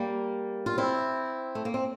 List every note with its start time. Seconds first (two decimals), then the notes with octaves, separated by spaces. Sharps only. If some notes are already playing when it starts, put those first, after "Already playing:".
Already playing: G3 A#3
0.66 F4
0.78 C4 E4
1.55 A3
1.65 A#3
1.74 C4